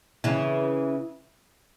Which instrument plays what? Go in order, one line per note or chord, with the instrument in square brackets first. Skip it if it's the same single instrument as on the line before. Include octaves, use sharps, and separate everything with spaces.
[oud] C#3 E3